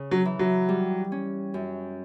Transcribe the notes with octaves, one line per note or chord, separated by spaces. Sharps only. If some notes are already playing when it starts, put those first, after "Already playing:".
Already playing: C#3
F#3
E3
F#3
G3
C#4
F#2